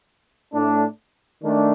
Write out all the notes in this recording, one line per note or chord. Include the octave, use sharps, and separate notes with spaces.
A2 A3 D4
D#3 A3 D4